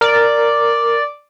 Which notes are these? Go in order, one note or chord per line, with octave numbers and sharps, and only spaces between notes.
A#4 D5